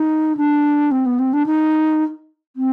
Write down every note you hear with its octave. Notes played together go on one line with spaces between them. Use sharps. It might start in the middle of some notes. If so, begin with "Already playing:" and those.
Already playing: D#4
D4
C4
B3
C4
D4
D#4
C4